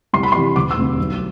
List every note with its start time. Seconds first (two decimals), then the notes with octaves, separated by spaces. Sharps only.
0.13 C2 C6
0.23 B5
0.32 C6
0.35 C3 E3 G3
0.56 E1 D6
0.71 E6
0.77 D2 C3
0.98 B1